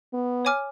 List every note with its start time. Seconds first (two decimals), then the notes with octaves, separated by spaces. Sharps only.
0.14 B3
0.45 C#5 G#5 D6 F6